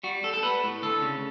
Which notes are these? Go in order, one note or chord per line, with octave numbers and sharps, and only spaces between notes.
G3 F#4
G3 A4
A4
B3 B4
A2
D2 A4
C#3